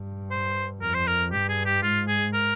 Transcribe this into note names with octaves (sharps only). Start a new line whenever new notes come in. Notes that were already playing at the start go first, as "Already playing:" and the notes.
Already playing: G2
C5
F2 A#4
C5
A#4
G2 G4
G#4
G4
G#2 F4
G#4
A#4